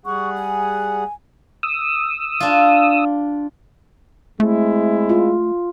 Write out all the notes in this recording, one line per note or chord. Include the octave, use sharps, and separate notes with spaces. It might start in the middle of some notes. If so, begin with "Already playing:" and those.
G3 G#4 F#5 C#6
G#5
D#6 E6
D4 F4
G#3 A3 C4 E4
F4